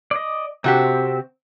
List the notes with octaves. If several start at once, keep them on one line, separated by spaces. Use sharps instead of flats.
D5 D#5
C3 C4 F#4 G4